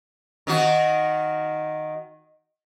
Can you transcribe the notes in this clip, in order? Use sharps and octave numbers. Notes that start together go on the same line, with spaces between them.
D#3 D#4 F#4